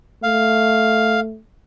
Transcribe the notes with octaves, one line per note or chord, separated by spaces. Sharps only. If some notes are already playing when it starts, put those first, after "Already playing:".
A3 F5